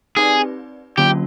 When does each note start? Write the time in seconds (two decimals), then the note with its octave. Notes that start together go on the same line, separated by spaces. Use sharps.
0.17 C4 D#4 G4 G#4 B4 D5
0.98 D3 F#3 A#3 C#4 F4 G4